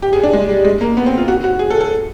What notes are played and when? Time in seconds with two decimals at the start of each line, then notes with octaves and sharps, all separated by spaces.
0.02 G4
0.13 G#4
0.23 D4
0.33 G#3
0.49 G3
0.65 G#3
0.81 A#3
0.97 B3
1.06 C4
1.18 F4
1.28 F#4
1.44 F#4
1.59 G#4
1.70 A4
1.81 A4